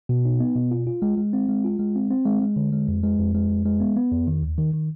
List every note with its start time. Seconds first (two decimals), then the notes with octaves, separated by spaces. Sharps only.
0.09 B2
0.25 D#4
0.40 B3
0.56 B2
0.71 F4
0.87 F4
1.02 G#3
1.17 G#3
1.33 C4
1.49 G#3
1.64 F4
1.79 G#3
1.96 C4
2.11 C4
2.25 G#3
2.42 G#3
2.56 D3
2.72 G#3
2.88 F2
3.03 G#3
3.18 F2
3.34 G#3
3.50 F2
3.66 G#3
3.80 B3
3.96 B3
4.12 F2
4.27 D#3
4.43 D#2
4.58 D#3
4.74 D#3